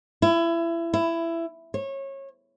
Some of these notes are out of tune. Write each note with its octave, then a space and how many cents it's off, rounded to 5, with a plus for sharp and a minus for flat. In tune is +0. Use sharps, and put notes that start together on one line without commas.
E4 +25
E4 +15
C#5 -25